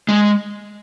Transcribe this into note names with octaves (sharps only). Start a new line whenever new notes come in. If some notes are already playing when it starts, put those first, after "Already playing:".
G#3